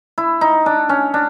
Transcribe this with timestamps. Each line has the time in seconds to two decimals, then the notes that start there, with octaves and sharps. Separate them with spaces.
0.18 E4
0.41 D#4
0.66 D4
0.89 C#4
1.14 D4